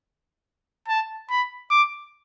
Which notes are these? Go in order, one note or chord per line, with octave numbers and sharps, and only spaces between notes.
A5
B5
D6